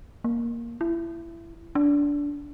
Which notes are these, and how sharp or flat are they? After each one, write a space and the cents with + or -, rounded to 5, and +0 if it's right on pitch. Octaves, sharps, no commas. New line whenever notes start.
A#3 +5
E4 +25
D4 -20